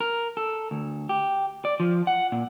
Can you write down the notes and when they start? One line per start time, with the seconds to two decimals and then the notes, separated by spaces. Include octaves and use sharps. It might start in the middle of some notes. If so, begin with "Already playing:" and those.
0.01 A#4
0.37 A4
0.71 D2
1.09 G4
1.65 D5
1.80 F3
2.07 F#5
2.32 A#2